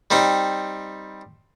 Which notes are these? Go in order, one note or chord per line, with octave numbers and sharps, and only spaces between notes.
G3 C4 D#4